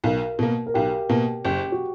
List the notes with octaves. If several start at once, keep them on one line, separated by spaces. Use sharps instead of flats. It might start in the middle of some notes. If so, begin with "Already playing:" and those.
B1 A#4
B2 A#3
A#4
B1 G4
B2 A#3
F#1 G4
F#4